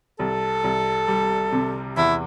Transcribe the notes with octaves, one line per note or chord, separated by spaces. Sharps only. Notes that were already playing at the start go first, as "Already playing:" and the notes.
C2 A4
C2
G3
C3
E2 E4